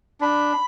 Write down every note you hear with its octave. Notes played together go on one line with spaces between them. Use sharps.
D4 B5